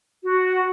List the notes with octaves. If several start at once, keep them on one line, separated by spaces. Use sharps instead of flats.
F#4